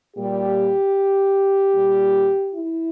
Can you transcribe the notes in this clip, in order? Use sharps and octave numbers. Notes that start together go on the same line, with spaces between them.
A#2 G3 G4
A#2 G3
E4